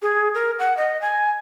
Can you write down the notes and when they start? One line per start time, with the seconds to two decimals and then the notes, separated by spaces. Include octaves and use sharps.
0.02 G#4
0.34 A#4
0.59 F#5
0.77 D#5
1.01 G#5